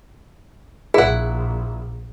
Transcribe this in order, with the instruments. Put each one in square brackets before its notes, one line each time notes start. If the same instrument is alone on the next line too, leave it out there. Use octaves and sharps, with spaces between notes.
[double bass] A#1 [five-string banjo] E4 F#5 [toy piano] G#4